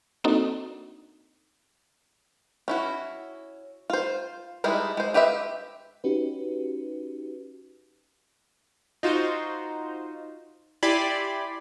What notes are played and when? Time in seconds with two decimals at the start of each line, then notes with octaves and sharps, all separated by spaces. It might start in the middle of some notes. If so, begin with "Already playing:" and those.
0.24 A#3 C4 D4 D#4 F#4 A4
2.68 C#4 E4 F#4
3.90 F4 C5
4.64 G3 G#3 D#4 E4
4.97 G#3 C5
5.14 F4 G4 B4 D#5 E5
6.04 C#4 D#4 F#4 G4 B4
9.03 D#4 F4 F#4 C5
10.83 E4 G4 D5 G#5 B5 C6